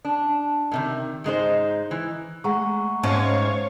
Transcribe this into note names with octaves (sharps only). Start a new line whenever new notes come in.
D4
A2 C3 D#3
G#2 G#3 D#4 C5
E3
G#3 A3 F#5 A#5 C#6
G#2 C#4 C#5 F5 A5 C#6